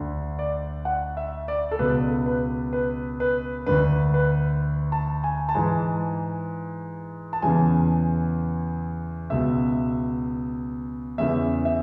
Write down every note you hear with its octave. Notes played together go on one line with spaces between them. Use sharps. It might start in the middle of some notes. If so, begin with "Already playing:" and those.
Already playing: D2 D3
D5
F#5
E5
D5
A4
C#2 B2 B4
B4
B4
B4
D2 D3 B4
B4
A5
G#5
A5
G#2 E3 G#5
A5
E2 C#3 E3 G#5
C#2 B2 E5
E2 C#3 E3 E5
E5